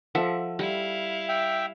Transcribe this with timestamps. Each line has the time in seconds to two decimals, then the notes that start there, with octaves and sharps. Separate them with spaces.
0.15 F3 A4 E5 F#5
0.59 G3 E4 F5
1.29 E5 G5